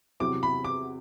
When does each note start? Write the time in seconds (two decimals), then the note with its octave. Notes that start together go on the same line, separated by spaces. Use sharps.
0.20 E2 C3 F#3 C4 E4 D6
0.43 B5
0.64 D6